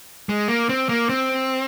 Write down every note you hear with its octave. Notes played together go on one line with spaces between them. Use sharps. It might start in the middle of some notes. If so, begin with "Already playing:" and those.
G#3
A#3
C4
A#3
C4